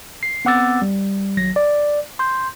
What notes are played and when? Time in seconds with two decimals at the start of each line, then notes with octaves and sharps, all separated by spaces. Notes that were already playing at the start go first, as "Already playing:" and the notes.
0.23 C7
0.45 B3 C4 F#5 D6 E6 A6
0.82 G3
1.37 G#1 F#3 A#6
1.56 D5
2.19 C6 G6